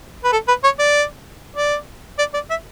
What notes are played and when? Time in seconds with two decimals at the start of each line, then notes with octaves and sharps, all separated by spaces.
0.24 B4
0.32 A4
0.48 B4
0.64 C#5
0.79 D5
1.56 D5
2.18 D5
2.34 D5
2.50 E5